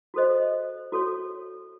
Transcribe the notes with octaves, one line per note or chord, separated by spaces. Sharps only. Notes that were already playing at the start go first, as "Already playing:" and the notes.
F#4 A4 C5 D#5
F#4 A4 C#5